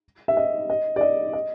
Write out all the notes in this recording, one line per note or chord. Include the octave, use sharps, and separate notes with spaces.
E5
D#5
D#5
D5
D#5
D#5